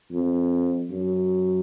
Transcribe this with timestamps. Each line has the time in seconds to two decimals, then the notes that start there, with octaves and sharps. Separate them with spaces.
0.12 F2
0.91 F#2